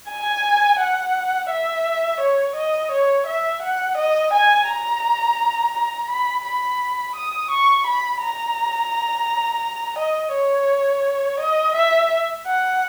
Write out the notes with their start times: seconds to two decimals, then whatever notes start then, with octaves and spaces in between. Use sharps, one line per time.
0.09 G#5
0.79 F#5
1.50 E5
2.21 C#5
2.56 D#5
2.92 C#5
3.27 E5
3.62 F#5
3.97 D#5
4.33 G#5
4.68 A#5
5.74 A#5
6.10 B5
6.45 B5
7.16 D#6
7.51 C#6
7.87 B5
8.21 A#5
9.98 D#5
10.34 C#5
11.40 D#5
11.75 E5
12.46 F#5